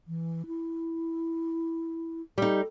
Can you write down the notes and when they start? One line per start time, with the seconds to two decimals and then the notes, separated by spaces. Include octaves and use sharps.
0.08 E3
0.46 E4
2.38 G3 D#4 A4